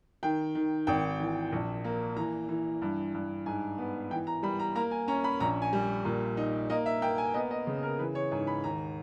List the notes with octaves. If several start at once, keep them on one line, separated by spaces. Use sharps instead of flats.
D#3 G5
D#3
G#1 G5
E3
A#1
A#3
E3 A#5
E3
G2
G2
G#2 G#5
B3
E3 G5
A#5
G3 B5
A#5
A#3 A#5
G#5
C#4 A#5
B5
A#1 A#5
G#5
G3
A#2
D#4
A#3 D#5
E5
A#3 G5
G#5
B3 D#5
D#5
C#3
A#4
E3 B4
C#5
G#2 G#5
B5
D#2 A#5